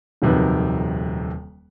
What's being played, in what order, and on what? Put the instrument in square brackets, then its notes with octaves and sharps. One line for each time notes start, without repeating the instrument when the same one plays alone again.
[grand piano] D#1 F2 C3 D#3 F#3 B4